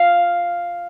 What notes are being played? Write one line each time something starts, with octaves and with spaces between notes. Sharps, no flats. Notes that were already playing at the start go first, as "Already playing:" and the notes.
Already playing: F5